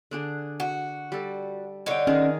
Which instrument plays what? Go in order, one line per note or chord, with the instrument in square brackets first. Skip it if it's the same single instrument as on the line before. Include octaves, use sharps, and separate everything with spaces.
[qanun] D3 D4 G#4
[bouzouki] F#4
[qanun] G3 A4
[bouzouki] D3 D#4 [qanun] C#5 G5
[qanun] D#3 G#4 A#4 [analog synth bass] C#4